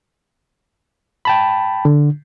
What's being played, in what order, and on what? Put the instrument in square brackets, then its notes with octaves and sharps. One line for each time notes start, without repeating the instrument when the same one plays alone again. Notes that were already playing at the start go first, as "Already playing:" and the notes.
[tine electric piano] G5 A5 B5
[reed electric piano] D3